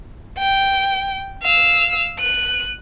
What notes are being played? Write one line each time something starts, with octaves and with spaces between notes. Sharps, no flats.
G5
F5 E6
F#6 D#7